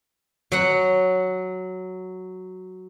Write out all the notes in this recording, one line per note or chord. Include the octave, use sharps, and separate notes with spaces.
F#3 F#5